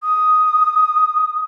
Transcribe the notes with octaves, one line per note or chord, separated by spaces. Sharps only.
D#6